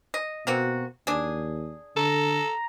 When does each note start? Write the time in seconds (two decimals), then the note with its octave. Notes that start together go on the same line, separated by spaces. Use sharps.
0.14 D#5
0.47 B2 A#3 C4 F#4
1.07 D#2 D4 G#4
1.96 D3 A4 A#5